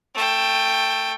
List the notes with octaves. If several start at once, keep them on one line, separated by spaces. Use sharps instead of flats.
A3 G5